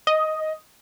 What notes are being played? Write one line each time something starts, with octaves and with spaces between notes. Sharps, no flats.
D#5